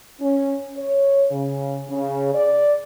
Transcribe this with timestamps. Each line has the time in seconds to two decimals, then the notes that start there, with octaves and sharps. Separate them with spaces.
0.20 C#4
0.76 C#5
1.31 C#3
1.89 C#3
2.34 D5